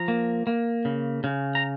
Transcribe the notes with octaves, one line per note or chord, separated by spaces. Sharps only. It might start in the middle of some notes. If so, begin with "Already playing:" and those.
Already playing: F3 A#5
A#3
A#3
C#3
C#3
A#5